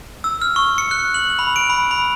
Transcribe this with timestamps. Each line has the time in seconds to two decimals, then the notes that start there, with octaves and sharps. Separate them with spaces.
0.24 E6
0.42 F6
0.56 C#6
0.78 C#7
0.91 F#6
1.14 F#7
1.39 B5
1.56 D7
1.70 B5
1.91 B5